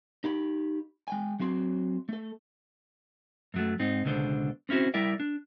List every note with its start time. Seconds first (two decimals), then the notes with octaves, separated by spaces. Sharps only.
0.24 D#4 G4 B5
1.08 G#3 G5 G#5
1.40 F#3 C4 F#4 C6
2.09 A3 A4
3.54 F#2 F#3 A3
3.79 G#2 C4 D#4
4.05 C#2 B2 D3 D4 C5
4.69 C4 C#4 E4 F#4 C5
4.94 G3 E4 A#4 D5 E5
5.20 D4